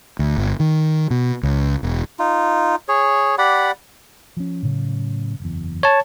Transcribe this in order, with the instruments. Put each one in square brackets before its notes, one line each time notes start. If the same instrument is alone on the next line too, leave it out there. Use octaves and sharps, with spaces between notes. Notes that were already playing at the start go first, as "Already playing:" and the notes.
[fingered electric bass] D2
G1
D#3
B2
C#2
E1
[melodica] D#4 F4
G#4 C#5
G4 D5 F#5 B5
[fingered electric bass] F3 C#4
A2 C#3 F#3
F#1 E2
[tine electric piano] C#5 A5